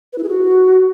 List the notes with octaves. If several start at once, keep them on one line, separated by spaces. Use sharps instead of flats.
B4
E4
G#4
F#4